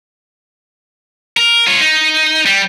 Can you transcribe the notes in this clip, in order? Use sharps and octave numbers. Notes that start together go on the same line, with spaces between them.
A#4
F4 C#5
D#4
G3